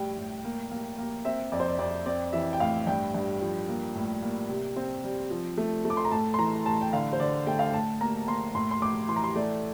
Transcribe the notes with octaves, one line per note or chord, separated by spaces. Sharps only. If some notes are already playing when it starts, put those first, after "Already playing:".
Already playing: A2 G3 G5
A2
A#3
A#3
A#3
C4 E5
F2 D5
C5
D5
F2 D5
C4 D5
E3 E5
G5
A2 F5
G2 G5
G2
F3
A#3
A2
A#3
C3
C4
G3
F3
A3
A3
D6
C6
A#5
A2 A5
C6
E3 A#5
A2 A5
G5
D3 F5
C5
D3 D5
A3 G5
F5
G5
A2 A5
A#3 A#5
A#3 C6
A2 C6
C6
A2 D6
E3 C6
A#5
C6
A3 D5